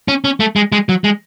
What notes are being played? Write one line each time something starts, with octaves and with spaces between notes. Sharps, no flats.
C#4
C#4
A3
G#3
G#3
F#3
G#3